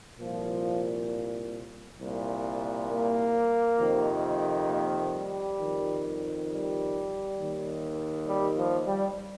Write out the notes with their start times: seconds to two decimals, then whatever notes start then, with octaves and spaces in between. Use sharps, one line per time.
0.19 C2 A#2 F3
1.99 C2 A#2
2.89 A#3
3.77 F2 C3 D#3
4.67 A#3
5.13 G3
5.57 F2 D#3
6.47 G3
7.37 D#2 D#3
8.27 G3
8.57 F3
8.86 G3